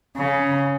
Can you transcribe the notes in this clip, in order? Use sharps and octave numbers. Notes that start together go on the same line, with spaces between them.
C#3